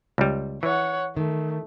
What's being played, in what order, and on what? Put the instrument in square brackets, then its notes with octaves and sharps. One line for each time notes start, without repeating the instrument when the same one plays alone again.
[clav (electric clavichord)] C#2 G3
[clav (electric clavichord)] E3 [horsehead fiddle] C#5 F#5
[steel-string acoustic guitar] D#3 [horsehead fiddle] A3